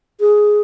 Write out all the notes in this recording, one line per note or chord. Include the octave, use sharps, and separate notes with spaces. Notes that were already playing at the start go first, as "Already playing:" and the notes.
G#4